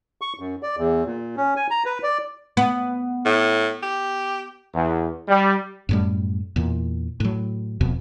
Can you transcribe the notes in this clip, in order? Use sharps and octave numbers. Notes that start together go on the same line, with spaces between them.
C#6
F#2
D5
E2
A#2
C#4
G#5
A#5
B4
D5
B3
A2
G4
E2
G3
F#2 A2 G3
E2 A#2
A2 F#3
D#1 F2 B2